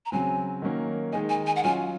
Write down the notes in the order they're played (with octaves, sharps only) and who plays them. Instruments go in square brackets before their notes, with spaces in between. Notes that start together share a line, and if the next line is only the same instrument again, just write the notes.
[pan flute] A#5
[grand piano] C#3 F#3 C4 [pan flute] G#5
[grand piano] D#3 F#3 A#3 C#4
[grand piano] D#3 G#3 D#4 [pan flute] G#5
[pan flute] G#5
G#5
F#5
[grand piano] F#3 C#4 F4 [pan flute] G#5